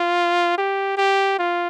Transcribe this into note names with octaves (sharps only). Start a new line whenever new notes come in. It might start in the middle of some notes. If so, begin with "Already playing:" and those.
Already playing: F4
G4
G4
F4